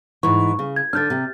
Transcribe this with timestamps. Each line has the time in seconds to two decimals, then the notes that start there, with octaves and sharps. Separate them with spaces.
0.23 G#2 E3 C#6
0.59 C#3
0.76 G#6
0.93 D3 D4 F6 G6 A6
1.10 C3